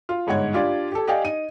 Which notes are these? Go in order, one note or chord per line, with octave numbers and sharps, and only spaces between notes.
F4
G1 G#2 C#5 F#5 G#6
D4 F4 G4 D5
G4 A4
G4 D5 D#5 F5 G5 G#5
D#4 D#7